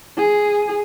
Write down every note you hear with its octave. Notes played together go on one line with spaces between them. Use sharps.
G#4